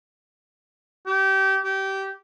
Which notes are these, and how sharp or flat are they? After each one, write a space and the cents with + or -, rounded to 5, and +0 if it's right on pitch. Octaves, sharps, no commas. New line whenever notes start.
G4 -25
G4 -20